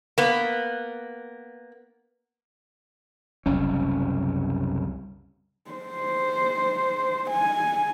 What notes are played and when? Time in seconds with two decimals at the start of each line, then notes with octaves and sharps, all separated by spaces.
0.18 A#3 B3
3.46 F#1 C2 C#4
5.71 C5
7.30 G#5